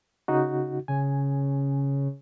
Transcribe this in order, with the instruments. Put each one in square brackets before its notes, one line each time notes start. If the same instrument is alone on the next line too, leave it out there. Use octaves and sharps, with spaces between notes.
[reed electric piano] C#3 D#4 F#4
[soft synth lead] C#3 [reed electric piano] G#5